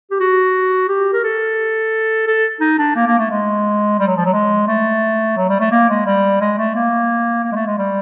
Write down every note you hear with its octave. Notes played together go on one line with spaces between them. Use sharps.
G4
F#4
G4
A#4
A4
A4
D#4
D4
A#3
A#3
A3
G#3
G3
F#3
F3
F#3
G#3
A3
F#3
G3
A3
A#3
G#3
G3
G#3
A3
A#3
A#3
G#3
A3
G#3
G3